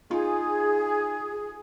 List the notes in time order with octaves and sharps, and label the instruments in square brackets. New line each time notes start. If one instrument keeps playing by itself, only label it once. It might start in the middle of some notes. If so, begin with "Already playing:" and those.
[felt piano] D#4 F4 [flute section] G#4